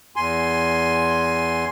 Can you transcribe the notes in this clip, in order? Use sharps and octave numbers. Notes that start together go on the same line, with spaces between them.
E2 G#5 C6